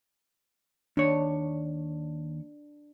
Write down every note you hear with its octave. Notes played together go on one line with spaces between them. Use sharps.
D#2 D4 C#5